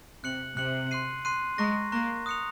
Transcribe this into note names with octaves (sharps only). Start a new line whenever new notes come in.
C3 F#6 C#7 F#7
C3 F#6 C#7 F#7
C6 F#6 C7 D#7
C6 F#6 C7 D#7
G#3 A#5 C#6 F#6 A#6
A#3 A#5 C#6 F#6 A#6
D#6 F#6 C#7 F7